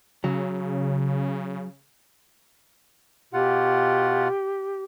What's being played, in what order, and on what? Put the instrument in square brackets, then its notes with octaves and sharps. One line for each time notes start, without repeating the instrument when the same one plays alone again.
[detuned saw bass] C#3 [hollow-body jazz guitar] F#3
[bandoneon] B2 F4 F#5 [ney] G4